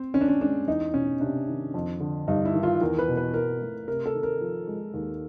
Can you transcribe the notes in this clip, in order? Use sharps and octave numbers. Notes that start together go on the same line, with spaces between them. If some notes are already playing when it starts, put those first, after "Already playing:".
Already playing: C4
D#3 C#4
D4
C#4
G#3 D4
E2 D#4
B2 C#4
C3 D4
D#3
F2
D3
G2 D#4
E4
D#3
F4
E2 A#4
B4
B2
B4
E3 A#4
A3
C3 A#4
A4
D#3
A#4
F3
G#3
D#2